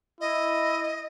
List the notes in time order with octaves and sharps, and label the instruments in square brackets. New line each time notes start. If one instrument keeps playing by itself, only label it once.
[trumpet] E4 [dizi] D#5